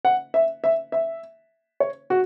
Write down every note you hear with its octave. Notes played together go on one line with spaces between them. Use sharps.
F#5
E5
E5
E5
C#5
F#4